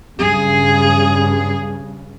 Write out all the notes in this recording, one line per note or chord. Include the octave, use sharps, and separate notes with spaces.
G2 C#3 G#4